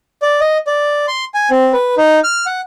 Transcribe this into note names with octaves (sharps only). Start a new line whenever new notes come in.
D5
D#5
D5
C6
G#5
C4
B4
D#4
F6
F#5